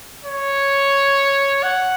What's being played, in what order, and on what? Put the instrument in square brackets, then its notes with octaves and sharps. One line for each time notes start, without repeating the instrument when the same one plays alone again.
[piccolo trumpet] C#5
F#5